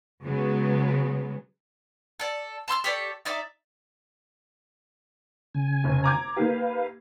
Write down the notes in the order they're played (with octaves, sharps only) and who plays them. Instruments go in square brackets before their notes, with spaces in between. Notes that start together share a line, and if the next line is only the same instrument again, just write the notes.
[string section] C#3 F#3 G#3 B3
[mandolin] A4 D5
A5 C6 E6 F6
G4 A4 C#5 D5
D#4 D5 E5 D6
[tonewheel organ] C#3 G#5
[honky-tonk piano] F1
A#5 D6 G#6
[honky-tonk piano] A#3 D#4 G4 [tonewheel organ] B4 F5